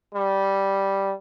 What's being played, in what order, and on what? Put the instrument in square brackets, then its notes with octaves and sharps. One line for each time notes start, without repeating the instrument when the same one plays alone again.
[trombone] G3